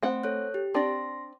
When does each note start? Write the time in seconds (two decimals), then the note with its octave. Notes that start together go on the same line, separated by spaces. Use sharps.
0.03 A3 C4 F#5
0.23 A4 C#5 F#6
0.54 G4
0.74 C4 D4 D5 C6 A#6